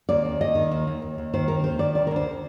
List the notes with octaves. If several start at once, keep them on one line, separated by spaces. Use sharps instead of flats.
D#2 D5
D#2
D#2 D#5
D#3
D#2
D#2
D#2
D#2
D#3 C5
D#2 A#4
D#3 C5
D#3 D5
D2 D5
A#4
D2
C5